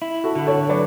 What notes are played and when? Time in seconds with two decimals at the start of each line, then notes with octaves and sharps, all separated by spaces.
0.02 E4
0.24 F#4 A4
0.35 D3
0.46 A4 C#5
0.69 F#3 B4 D5